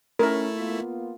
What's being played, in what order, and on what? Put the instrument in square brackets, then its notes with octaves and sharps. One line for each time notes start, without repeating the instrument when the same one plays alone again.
[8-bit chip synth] A3 E4 [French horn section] C#4 [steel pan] A#4
[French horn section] A#3 B3 F4